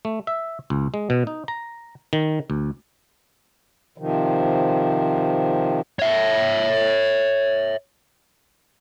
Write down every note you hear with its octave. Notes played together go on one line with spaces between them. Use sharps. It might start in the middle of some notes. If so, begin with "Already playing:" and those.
A3
E5
C#2
G#3
B2
D#4
A#5
D#3
D2
C3 D#3 F3
C#5 E5